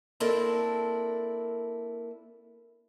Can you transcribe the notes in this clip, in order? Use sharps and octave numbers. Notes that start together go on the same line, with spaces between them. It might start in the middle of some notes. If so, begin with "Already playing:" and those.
A#3 C4 D4 E4 A4 A#4